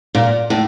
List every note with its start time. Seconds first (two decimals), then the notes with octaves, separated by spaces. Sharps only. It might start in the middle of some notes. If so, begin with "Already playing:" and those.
0.15 A#2
0.50 A2